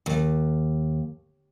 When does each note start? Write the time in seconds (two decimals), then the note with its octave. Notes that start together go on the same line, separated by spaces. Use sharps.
0.06 D#2